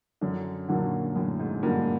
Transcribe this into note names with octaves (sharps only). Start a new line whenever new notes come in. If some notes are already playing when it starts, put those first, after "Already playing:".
F#2 D3
A#2 D3 F#3 A#3
F#2 A2
G#2
G2 D3 F#3 A#3